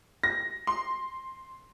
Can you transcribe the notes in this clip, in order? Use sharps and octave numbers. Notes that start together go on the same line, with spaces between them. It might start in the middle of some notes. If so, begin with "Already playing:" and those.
A#6
C6